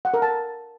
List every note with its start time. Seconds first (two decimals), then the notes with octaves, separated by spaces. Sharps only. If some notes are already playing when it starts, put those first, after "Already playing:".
0.05 F#5
0.14 A#4
0.22 A5